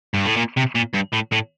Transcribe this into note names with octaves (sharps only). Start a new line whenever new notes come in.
G2
A2
A#2
C3
A#2
G2
A2
A2